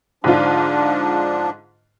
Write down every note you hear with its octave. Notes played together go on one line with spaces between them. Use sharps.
G#2 D3 F3 D4 F4